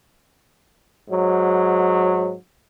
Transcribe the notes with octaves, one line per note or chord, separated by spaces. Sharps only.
G#2 F#3